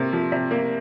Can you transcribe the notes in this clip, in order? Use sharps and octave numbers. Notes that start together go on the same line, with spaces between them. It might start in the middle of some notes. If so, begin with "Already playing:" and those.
Already playing: C3 A#3
F3
C3
A#3